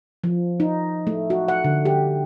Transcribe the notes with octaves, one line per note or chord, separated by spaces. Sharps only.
F3
D#4
A3
F#4
F#5
D3
G4